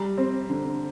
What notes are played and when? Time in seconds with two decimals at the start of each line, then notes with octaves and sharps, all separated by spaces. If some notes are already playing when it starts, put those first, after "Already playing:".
Already playing: G3 A#5
0.18 C4
0.49 D3